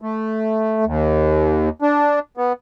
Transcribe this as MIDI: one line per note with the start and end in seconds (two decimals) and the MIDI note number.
0.01 0.85 57
0.85 1.69 39
1.82 2.19 62
2.37 2.53 59